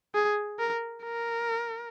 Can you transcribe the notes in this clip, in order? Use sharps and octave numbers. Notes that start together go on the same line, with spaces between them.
G#4
A#4
A#4